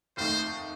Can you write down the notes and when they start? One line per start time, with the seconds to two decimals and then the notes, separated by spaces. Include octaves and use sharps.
0.17 F1 D#2 D#3 A3 D#4 C5